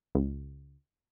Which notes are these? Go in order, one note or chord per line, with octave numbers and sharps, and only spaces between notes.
C#2